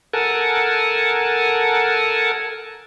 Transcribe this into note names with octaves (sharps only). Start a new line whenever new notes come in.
A4 A#4 F#5 G#5 A5